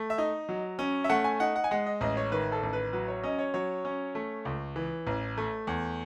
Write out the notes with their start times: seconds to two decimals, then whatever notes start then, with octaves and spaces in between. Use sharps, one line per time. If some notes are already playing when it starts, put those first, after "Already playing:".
Already playing: A3
0.10 E5
0.18 D#4 D#5
0.49 F#3
0.79 C#4
1.04 E5
1.09 A3 F#5
1.24 G#5
1.40 D#4 F#5
1.56 F#5
1.64 G#5
1.71 G#3 F#5
1.86 D#5
2.01 A1 D#5
2.17 C#5
2.32 D#3 B4
2.52 A4
2.63 A1
2.73 B4
2.93 F#3 B4
3.08 C#5
3.24 C#4 D#5
3.39 C#5
3.54 F#3 C#5
3.85 C#4
4.15 A3
4.45 C#2
4.76 E3
5.07 A1
5.38 A3
5.67 E2